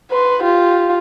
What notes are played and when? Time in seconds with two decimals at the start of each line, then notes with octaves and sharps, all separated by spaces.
0.11 B4 C6
0.43 F4 G4